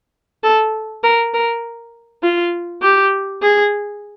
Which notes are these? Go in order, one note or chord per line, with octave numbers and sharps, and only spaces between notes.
A4
A#4
A#4
F4
G4
G#4